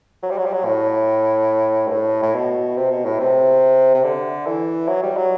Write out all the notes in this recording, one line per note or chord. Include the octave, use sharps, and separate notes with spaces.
F#3
G3
F#3
G3
F#3
A2
G2
A2
A2
B2
C3
B2
A2
C3
C3
D3
E3
F#3
G3
F#3